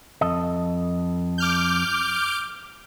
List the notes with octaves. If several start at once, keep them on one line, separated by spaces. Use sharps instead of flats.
F2 A4 D#5
D6 F6 G6